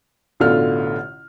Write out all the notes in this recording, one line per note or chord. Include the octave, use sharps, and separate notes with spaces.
A1 B2 D3 A3 F4 F6